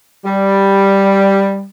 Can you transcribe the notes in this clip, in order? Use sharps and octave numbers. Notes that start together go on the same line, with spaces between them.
G3